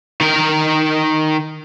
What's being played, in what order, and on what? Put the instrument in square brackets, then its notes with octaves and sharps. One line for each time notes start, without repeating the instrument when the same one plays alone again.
[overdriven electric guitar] D#3 A#4